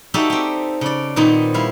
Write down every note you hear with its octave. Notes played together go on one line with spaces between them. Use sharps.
D#4 F#4 G4 A4 D5 E5
C4 G4
C#3 D5
A#2 D#3 B3 C4 D#4
G3 E4 F5